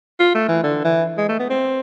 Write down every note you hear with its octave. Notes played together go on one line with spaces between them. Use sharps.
F4
A3
E3
D3
E3
G#3
A3
B3
C4